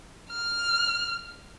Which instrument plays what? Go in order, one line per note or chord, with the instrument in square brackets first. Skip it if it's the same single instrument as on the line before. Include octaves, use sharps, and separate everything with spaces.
[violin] F6